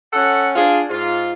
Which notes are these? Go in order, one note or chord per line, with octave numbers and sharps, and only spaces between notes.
C#4 A4 F#5
D4 F4 G#4
G#2 F4